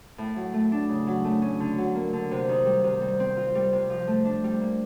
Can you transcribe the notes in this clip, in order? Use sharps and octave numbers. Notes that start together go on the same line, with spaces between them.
A2
F#3
A3
D4
C#3
F#3
A3
C#4
D3
F#3
A#3
D3
C3
D#3
G3
C3
G3
C4
F4
G3
C3
F3
A3
D4
G3
A#3